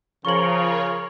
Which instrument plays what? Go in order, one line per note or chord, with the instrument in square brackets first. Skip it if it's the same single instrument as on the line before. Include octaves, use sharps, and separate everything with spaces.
[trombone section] C#3 [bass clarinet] F3 [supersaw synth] F4 A#4 C#5 [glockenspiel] C#6 F#7